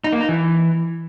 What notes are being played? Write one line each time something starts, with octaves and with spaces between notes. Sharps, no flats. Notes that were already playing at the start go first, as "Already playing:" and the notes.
D#4
A#3
D#4
E3